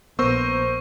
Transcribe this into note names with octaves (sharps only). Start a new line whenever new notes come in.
A#1 B3 A#4 C5 C#6 E6